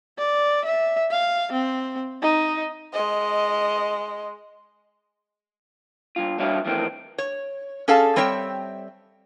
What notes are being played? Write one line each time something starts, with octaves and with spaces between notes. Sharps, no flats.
D5
E5
F5
C4
D#4
G#3 D#5
G2 F4
G3 D4 F#4 C#5 E5 F5
F2 D#3 E3 A3 C4
C#5
C#4 G#4 A4 D5 F5 A5
G3 C4 C#5 E5 G5